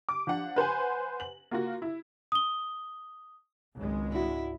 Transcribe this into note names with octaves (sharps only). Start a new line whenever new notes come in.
D6
F3 D4 F#5
B4 C5 F#5 G#5
F#7
A#3 F4 F#4
E4
D#6 G7
G#1 C#2 G#3
D4 E4 F#4